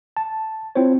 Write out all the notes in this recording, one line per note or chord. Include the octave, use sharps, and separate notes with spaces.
A5
C4 E4 F4 C5 C#5